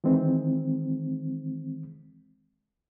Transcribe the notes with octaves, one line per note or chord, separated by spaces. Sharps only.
D#3 E3 G#3 C4